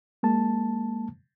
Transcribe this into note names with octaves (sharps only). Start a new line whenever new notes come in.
G#3 A#3 A5